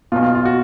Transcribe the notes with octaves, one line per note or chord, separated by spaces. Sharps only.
B1 B2 F4
F4
F4
F#4